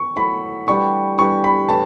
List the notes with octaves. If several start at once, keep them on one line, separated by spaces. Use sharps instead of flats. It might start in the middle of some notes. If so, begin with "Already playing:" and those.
Already playing: C#6
F#3 A3 E4 A4 B5
E3 G3 D4 G4 C#6
E3 G3 D4 G4 C#6
B5
A2 E3 A5